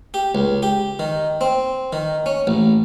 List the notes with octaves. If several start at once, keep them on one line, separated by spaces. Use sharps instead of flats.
G4
C#2
G4
D#3
C4
D#3
C#4
A1